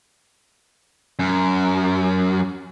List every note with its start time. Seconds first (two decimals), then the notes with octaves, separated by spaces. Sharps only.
1.19 F#2